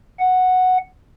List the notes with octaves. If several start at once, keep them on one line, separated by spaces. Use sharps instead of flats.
F#5